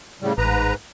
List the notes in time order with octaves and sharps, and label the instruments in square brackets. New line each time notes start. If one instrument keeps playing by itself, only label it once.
[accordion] A2 C#3 G3
[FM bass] A1 [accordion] G#2 B4 A#5